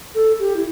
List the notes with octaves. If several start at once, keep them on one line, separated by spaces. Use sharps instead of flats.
A4
G4
E4